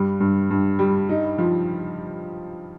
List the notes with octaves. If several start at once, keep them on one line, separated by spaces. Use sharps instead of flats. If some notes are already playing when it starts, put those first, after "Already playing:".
Already playing: G2 G3
G2
G2
G3
D#4
F3